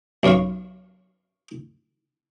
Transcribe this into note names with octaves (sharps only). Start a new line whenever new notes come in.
B1 F#2 C#5 F5 C#6